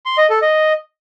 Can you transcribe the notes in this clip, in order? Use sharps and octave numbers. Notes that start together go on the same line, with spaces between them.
C6
D#5
A4
D#5